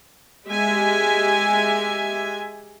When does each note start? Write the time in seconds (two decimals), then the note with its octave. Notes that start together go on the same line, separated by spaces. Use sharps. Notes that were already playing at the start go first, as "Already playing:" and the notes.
0.48 G#3 G4 E5 G#5